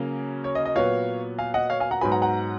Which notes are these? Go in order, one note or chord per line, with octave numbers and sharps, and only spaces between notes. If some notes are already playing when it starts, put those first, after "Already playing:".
Already playing: C#3 F#3 A#3 C#4
C#5
D#5
D#5
A#2 F#3 B3 C#5 F5
F5 G#5
D#5 F#5
C#5 F5
F5 G#5
F#5 A#5
G#2 F#3 B3 G#5 B5
F#5 A#5
F#5 A#5